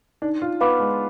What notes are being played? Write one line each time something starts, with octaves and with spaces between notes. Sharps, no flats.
D4 D#4
F4
B3 B4 F5 B5 D6
G#3